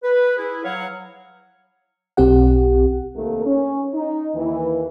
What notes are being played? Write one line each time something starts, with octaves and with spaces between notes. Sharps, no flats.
B4
E4 G#4
F#3 C#5 F5 F#5
B1 C4 G4 F#5
C3 D#3 A3 A#3
C#4
D#4
D#2 E3